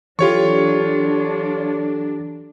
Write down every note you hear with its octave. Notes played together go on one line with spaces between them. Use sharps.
E3 F#3 D4 F4 G4 A4 C#5 C#6